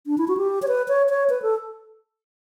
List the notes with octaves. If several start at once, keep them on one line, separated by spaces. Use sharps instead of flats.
D4
E4
F#4
G4
C#5
B4
C#5
C#5
B4
A4